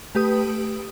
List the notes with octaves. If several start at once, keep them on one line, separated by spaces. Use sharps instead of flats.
A3 G4 B4 D#6